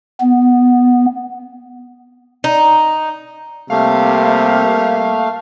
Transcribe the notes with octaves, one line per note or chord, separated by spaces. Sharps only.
B3
D#4
C3 G3 A3 A#3 F5